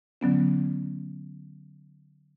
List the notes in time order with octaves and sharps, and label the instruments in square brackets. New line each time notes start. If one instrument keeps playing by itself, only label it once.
[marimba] D3 F#3 B3 C#4